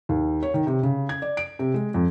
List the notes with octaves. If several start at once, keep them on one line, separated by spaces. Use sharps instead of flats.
D#2
C#5
D#3
C3
C#3
G#6
D5
D7
C3
G#3
F2